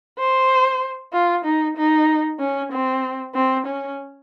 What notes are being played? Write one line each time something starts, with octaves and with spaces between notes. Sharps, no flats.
C5
F4
D#4
D#4
C#4
C4
C4
C#4